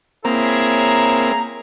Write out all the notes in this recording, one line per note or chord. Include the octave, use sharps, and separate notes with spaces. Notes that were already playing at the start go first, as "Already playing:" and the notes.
A#3 C4 E4 G#4 C#5 A#5